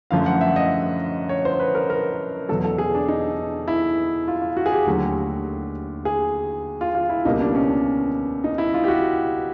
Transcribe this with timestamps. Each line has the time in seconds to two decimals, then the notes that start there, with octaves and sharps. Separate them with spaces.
0.11 F#2 D3 F3 A3 F5
0.26 F#5
0.41 E5
0.56 D#5
1.29 C#5
1.45 C5
1.60 B4
1.75 A#4
1.90 A#4
2.49 E2 B2 F#3 A4
2.64 A4
2.78 G#4
2.94 D4
3.08 D#4
3.68 E4
4.28 F4
4.42 F4
4.57 F#4
4.66 G#4
4.72 G4
4.87 D#2 D3 F#3 A3
6.05 G#4
6.81 F4
6.95 F4
7.09 E4
7.25 C#2 B2 G3 A#3 D#4
7.40 D4
7.55 C#4
7.69 D4
8.44 D#4
8.58 E4
8.74 F4
8.84 G4
8.88 F#4